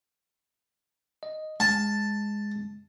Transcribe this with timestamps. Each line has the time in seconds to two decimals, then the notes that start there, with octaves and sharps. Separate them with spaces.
1.23 D#5
1.60 G#3 A5